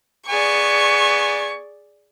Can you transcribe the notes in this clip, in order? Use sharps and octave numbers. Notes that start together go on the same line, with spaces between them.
B3 G#4 D5 G#5 C#6